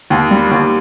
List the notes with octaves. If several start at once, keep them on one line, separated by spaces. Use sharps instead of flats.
D#2
G3
D#2